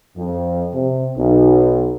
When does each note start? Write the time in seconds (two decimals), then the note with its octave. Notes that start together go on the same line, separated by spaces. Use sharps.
0.16 F2
0.73 C3
1.17 B1